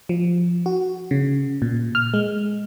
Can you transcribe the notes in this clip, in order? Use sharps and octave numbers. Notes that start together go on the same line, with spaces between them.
F3
F#4
C#3
A#2
F6
G#3